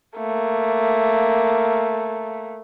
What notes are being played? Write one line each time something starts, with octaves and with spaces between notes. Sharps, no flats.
A3 A#3